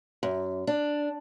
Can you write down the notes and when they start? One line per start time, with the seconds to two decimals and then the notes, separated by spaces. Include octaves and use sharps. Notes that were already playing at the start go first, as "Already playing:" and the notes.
0.23 F#2
0.67 D4